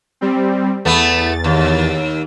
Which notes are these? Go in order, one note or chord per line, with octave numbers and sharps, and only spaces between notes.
G3 C4
E2 A3 B3 A6
D#2